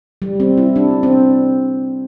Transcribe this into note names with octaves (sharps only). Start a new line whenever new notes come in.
G3
C4
E4
D4
C4